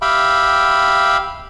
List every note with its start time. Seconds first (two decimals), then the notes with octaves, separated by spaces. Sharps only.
0.02 G4 E5 F5 G5 B5